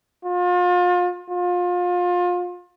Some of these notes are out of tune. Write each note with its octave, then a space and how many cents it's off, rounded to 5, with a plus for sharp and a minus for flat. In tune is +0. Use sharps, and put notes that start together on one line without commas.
F4 +35
F4 +30